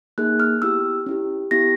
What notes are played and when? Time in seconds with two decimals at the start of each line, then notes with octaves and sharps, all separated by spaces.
0.18 A#3 D#4 G#4 F#6
0.40 F6
0.62 B3 E4 G4 E6
1.06 C#4 E4 G4
1.51 B3 E4 G4 A#6